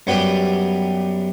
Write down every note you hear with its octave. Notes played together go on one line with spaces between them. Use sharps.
F#2 G3 B3 G4 B4 G5